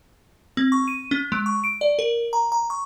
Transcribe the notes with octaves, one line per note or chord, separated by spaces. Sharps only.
C4
C#6
D#7
C#4
G#3
C#6
D7
D5
A#4
A#5
A#5
C#6